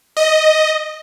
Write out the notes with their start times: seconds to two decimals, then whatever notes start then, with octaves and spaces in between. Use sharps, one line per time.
0.17 D#5